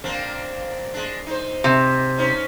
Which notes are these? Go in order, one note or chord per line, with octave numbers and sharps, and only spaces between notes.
A#3 C4 D4
G#3 D4
D#4 C5
C3
C#4 D#4 C5